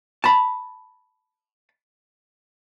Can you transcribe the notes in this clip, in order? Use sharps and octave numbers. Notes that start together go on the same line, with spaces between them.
A5 B5